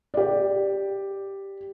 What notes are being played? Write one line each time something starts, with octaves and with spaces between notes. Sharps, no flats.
G4 D5